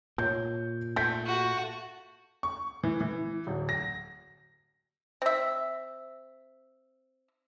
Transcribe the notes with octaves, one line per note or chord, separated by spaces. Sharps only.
A#2 C#5 G6
A3 G6 B6
F#4
C#6
E3
E3
D1
A#6
C4 E5